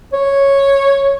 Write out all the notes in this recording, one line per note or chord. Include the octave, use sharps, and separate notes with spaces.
C#5